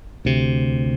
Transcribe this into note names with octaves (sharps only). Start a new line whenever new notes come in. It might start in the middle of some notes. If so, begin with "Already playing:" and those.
D2 C3